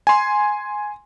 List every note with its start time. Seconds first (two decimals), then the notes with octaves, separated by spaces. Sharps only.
0.07 G#5 C6